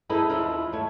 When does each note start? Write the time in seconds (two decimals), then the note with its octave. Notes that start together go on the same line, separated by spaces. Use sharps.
0.09 D#4 E4 G#4 A4 B4 E5
0.30 D#2 B3 E4 F4
0.72 A3 C#5